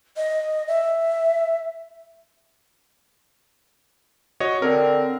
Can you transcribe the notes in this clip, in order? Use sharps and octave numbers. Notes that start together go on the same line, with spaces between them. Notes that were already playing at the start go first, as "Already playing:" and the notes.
D#5
E5
F#4 C#5 D#5
D3 C4 A#4